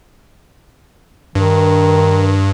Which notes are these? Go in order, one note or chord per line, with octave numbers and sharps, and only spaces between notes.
G2 D#3